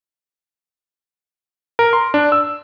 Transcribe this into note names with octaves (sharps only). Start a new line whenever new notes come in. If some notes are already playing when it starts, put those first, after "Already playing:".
A#4
C6
D4
E6